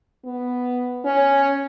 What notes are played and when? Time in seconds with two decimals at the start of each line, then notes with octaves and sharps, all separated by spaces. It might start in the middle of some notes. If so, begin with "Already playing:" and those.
0.25 B3
1.05 C#4